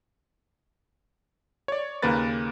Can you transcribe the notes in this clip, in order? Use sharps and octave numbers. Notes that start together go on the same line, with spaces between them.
C#5 D5
D#2 C#3 A#3 A#4 B4 A6